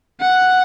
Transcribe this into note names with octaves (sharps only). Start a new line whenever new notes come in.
F#5